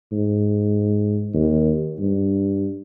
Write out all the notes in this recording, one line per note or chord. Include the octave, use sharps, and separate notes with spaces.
G#2
D#2
G2